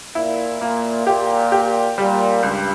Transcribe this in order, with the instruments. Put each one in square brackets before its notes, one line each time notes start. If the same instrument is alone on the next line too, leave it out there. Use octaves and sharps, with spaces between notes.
[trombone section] A#2 [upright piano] E4
[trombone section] A#2 [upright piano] A#3
[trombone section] A#2 [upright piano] G4
[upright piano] G4
[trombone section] A#2 [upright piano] G3
[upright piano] C#2 [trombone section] G2